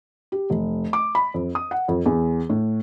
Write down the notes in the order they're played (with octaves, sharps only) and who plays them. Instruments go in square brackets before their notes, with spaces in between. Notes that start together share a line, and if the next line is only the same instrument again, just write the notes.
[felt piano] G4
F1
D6
B5
F2
D#6
F#5
F2
E2
A2